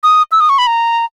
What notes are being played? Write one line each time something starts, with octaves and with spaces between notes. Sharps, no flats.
D#6
E6
D#6
C#6
B5
A#5